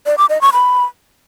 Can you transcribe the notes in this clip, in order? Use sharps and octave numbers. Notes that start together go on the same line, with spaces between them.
D5
D6
D#5
C#6
B5